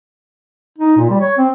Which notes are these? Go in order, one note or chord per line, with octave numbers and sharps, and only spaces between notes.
D#4
A#2
G3
C#5
C4